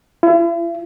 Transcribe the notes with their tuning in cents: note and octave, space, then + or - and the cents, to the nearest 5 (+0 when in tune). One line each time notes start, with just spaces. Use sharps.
E4 +45